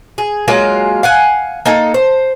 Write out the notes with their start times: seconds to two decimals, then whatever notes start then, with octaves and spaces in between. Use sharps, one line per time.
0.18 G#4
0.48 F#3 G#3 A#3 F4
1.03 F5 F#5 G#5
1.66 A#3 D#4 A4
1.94 C5